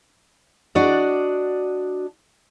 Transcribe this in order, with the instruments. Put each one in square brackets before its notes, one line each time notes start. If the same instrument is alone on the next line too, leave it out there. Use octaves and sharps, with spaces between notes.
[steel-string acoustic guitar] D4 F#4 D5 D#5